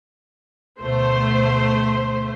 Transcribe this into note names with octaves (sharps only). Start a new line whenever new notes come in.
D2 B2 A3 C5